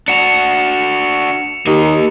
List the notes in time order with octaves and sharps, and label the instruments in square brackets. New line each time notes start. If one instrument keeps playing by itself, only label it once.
[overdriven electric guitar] D4 F#4 [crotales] C#7 E7 F7
[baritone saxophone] D#2 [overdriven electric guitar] A#3 D#5